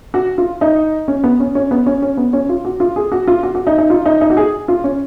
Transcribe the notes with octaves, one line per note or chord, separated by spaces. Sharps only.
F#4
F4
D#4
C#4
B3
C#4
C#4
B3
C#4
C#4
B3
C#4
F4
F#4
F4
G#4
F#4
F4
F#4
F#4
D#4
D#4
F4
D#4
D#4
F#4
G#4
F4
C#4